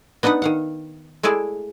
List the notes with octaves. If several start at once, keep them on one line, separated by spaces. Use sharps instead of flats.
B3 D4 D#4 B4 F#5
D#3 F5 F#5
G#3 A3 E4 G#4 D5